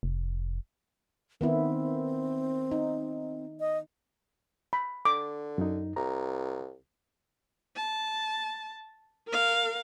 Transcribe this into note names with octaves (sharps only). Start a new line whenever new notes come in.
F1
D#3 B3 C4 E4
D#4
D#5
B5
D3 D6
F#2 D#4
C2 A#5
A5
A#4 F5